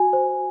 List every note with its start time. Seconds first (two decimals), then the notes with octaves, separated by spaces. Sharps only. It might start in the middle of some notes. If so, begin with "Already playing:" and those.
Already playing: F#4 G#5
0.13 C5